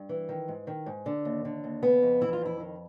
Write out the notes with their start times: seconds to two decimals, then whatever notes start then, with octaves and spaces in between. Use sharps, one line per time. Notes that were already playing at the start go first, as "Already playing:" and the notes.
Already playing: G2
0.09 E3
0.29 D#3
0.48 G#2
0.67 D#3
0.86 G#2
1.06 D3
1.25 D#2
1.45 D3
1.64 D#2
1.82 C#3 B3
2.02 F2
2.21 E3 E4
2.33 F4
2.41 F2 E4
2.60 D#3